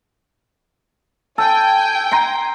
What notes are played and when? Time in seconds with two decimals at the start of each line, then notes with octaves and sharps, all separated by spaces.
1.38 A4 G5 G#5
2.12 A#5 C6